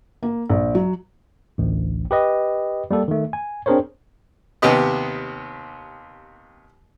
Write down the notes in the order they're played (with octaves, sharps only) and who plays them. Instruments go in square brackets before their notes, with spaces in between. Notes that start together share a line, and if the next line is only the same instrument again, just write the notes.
[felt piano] A#3
A#1
F#3
[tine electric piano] A1 D2
G4 B4 D#5
G3 A#3 A4
D#3 A3
G#5
C4 D4 G#4 A#4 C5 C#5
[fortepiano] D#2 C3 B3 G4 B4 D#5